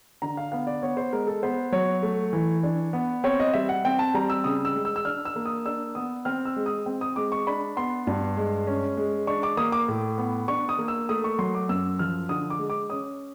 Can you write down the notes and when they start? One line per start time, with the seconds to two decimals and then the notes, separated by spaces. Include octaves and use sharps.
0.22 D3 A#5
0.37 F5
0.52 B3 F5
0.67 D5
0.82 B3 C#5
0.97 C5
1.13 G#3 A#4
1.27 A4
1.43 B3 C5
1.72 F#3 C#5
2.03 A3
2.33 E3
2.63 D4
2.93 B3
3.24 C4 C#5
3.40 D#5
3.54 G3 E5
3.69 F#5
3.85 C4 G5
3.99 A5
4.14 G3 A#5
4.30 E6
4.44 C#3 D#6
4.65 E6
4.75 G#3
4.85 E6
4.96 E6
5.05 D4 F6
5.25 E6
5.36 A#3
5.45 D#6
5.66 D4 E6
5.95 B3 D#6
6.25 C4 F6
6.45 E6
6.56 G#3
6.66 D#6
6.86 C4
7.01 D#6
7.16 G#3 D6
7.32 C#6
7.47 D4 B5
7.77 B3 C6
8.07 G2
8.37 G#3
8.67 C#4
8.97 G#3
9.27 D4 C#6
9.43 D6
9.57 A#3 D#6
9.72 D6
9.88 A2
10.18 B3
10.48 D4 C#6
10.69 D#6
10.79 A#3
10.88 E6
11.09 A3 D#6
11.24 C#6
11.39 F#3 C6
11.55 D6
11.69 F#2 E6
11.99 F3 F6
12.29 D3 D#6
12.50 D6
12.59 G#3
12.70 D6
12.90 C#4 D#6